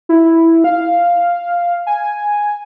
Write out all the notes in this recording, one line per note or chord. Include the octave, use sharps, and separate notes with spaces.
E4
F5
G#5